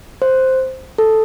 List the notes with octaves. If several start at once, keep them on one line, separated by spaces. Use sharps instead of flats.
C5
A4